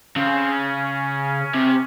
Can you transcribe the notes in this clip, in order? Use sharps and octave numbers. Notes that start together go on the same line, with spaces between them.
C#3 C4
C#4
C3